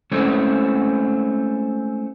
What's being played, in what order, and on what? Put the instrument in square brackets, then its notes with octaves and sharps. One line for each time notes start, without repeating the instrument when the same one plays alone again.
[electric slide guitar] G#3 A3 C4 C#4 E4